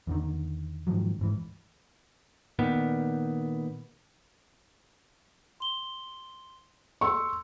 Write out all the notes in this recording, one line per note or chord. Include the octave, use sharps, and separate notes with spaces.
E2 D3 D#3
G#2 D#3 F3 F#3
D1 G#2 E3
A#2 D#3 B3
C6 G7
C6 C#6 E6